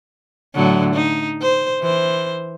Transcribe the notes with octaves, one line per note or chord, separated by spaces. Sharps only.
A2 D3 F#3
D#4
C5
E3 C5